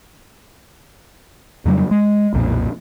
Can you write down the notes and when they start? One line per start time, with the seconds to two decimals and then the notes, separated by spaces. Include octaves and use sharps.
1.65 F2 C#3 F#3 G3
1.91 G#3
2.34 B1 F2 A#2